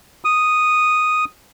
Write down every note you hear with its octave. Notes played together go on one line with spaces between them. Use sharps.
D#6